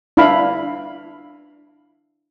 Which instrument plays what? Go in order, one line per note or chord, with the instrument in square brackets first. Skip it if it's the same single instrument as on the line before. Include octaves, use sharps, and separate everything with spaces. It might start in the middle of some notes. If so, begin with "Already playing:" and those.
[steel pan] D4 E4 F5 B5